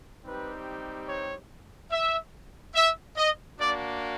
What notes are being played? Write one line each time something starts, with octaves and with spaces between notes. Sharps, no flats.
G3 C4 D#4 G4 B4
C#5
E5
E5
D#5
A#3 D4 F#4 D5